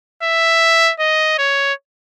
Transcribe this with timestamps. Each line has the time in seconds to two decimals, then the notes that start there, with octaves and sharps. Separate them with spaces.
0.23 E5
1.00 D#5
1.38 C#5